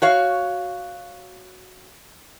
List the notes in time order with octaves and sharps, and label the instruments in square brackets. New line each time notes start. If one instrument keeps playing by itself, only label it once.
[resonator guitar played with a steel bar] F#4 C#5 F5